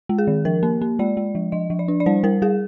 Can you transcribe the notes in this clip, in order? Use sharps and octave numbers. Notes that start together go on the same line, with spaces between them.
G#3
G#4
D#3
F3 A#4
A#3
A#3
G#3 D5
G#3
F3
F3 D#5
F3
D5
D4
D5
G3 C5
G3 A#4
G3 G#4